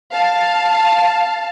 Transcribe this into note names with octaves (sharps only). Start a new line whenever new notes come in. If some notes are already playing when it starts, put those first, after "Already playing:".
F5 A5